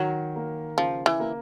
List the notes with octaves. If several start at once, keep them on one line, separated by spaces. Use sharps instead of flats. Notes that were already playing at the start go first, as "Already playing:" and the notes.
Already playing: D#3 F#3
A#3
C#3 F3
E3
A#3